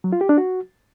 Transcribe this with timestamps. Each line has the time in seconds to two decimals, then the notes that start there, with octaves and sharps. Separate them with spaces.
0.04 F#3
0.13 F4
0.21 G4
0.29 D4
0.38 F#4